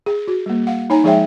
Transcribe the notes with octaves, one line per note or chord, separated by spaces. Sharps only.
G#4
F#4
G3 A#3
F5 F#5
D#4 C#5 G#5 A#5
F3 G#3 G#4 C#5 E5 G5